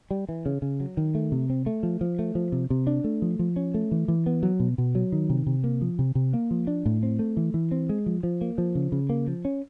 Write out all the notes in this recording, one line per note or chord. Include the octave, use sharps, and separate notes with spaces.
G3
E3
C#3
C#3
F#3
D#3
A3
C3
C4
A3
F3
F3
A3
F3
C3
C3
D4
A3
F3
F3
C#4
A3
E3
E3
B3
F#3
B2
B2
F#3
D#3
C3
C3
A#3
F3
C3
C3
A#3
F3
D4
A2
C4
A3
E3
E3
C4
G#3
F3
F3
A#3
F3
C#3
C#3
A#3
F3
C#4